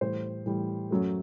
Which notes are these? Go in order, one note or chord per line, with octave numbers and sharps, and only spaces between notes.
A2 E3 G3 C5
A2 E3 G3
F#2 F#3 A3